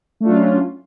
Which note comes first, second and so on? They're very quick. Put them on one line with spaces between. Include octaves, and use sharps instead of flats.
A3 D4 F4 F#3 C#4